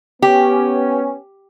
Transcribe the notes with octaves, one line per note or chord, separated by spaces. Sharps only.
B3 C#4 G4